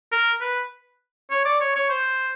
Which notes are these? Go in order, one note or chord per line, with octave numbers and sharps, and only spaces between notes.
A#4
B4
C#5
D5
C#5
C#5
C5